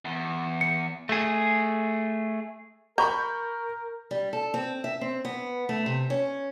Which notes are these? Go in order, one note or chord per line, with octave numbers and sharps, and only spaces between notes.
E2
C#7
A3 G#4
A#4 A#5 B5 C#6 G6
G3
A4
C4
E5
C4
B3
A3
C3
C#4